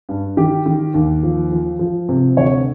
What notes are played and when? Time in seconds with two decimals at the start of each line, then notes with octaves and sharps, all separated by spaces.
0.09 G2
0.37 D#3 G4
0.66 D#3
0.94 D#2
1.23 F3
1.51 F3
1.79 F3
2.09 C3
2.36 D2 C#5